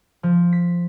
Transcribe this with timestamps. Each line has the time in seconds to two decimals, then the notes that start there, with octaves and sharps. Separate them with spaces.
0.23 F3
0.53 B6